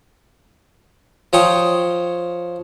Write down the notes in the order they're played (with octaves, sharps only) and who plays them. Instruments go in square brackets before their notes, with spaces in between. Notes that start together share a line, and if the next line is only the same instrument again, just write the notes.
[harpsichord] F3 C#5 G5 D#6